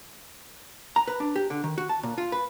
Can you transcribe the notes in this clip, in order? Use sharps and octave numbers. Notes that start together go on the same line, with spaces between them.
A#5
B4
D4
G4
D3
D#3
F#4
A5
A#2
F4
B4